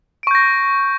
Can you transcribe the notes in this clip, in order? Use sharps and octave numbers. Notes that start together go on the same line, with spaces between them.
C#6 G6 A#6 D7